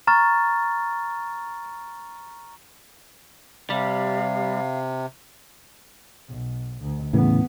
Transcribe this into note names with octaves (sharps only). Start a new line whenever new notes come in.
A#5 C#6 F6 A6
C3 G3 F5
B1
D2
E2 A2 C#3 E3 B3